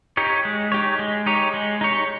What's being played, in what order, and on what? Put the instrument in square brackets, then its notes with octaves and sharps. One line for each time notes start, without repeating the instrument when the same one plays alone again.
[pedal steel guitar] D#4 G4 C#5
G#3
D#4 G4 C#5
G#3
D#4 G4 C#5
G#3
D#4 G4 C#5